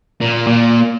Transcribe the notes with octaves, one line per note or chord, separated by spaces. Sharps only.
A#2
A#2